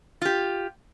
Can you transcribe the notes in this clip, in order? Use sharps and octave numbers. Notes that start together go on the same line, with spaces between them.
F4 G4